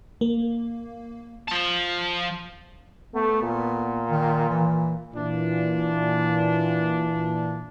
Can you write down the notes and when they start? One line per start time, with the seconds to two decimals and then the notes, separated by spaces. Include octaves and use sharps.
0.21 A#3
1.48 F3 A5
3.14 A3 B3
3.43 A#2
4.11 D#3
4.49 E3
5.14 A#2 E3 D4